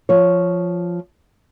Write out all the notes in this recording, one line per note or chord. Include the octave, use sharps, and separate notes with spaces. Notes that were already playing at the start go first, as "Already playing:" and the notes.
F3 C#5